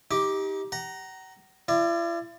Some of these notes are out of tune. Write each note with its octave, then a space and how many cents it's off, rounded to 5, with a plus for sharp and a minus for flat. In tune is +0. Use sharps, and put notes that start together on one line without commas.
D#4 +30 G4 +0 D6 +0
F#5 +40 A#5 +0
E4 +45 D5 +25